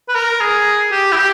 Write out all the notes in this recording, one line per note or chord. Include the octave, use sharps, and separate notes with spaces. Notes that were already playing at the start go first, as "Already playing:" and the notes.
B4
A#4
G#4
G4
E4
G4